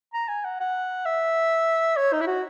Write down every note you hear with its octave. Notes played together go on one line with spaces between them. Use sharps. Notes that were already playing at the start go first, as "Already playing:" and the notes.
A#5
G#5
F#5
F#5
E5
C#5
D#4
E4
F#4